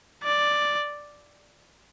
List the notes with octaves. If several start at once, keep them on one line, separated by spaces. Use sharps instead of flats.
D5